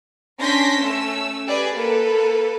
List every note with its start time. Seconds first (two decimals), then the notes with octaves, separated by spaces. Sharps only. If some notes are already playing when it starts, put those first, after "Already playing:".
0.39 C#4 D4 C6 G6 A#6 B6
0.81 A3 C#4 E6
1.46 G4 G#4 B4 D5
1.75 A#3 A4 B4